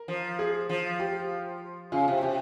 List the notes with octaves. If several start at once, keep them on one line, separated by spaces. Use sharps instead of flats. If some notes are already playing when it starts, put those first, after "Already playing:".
Already playing: A#4
F3
G#4
F3
G4
C#3 F4
C3
C3 G4